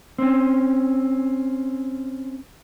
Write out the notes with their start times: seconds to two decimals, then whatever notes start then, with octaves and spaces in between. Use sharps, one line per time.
0.19 C4 C#4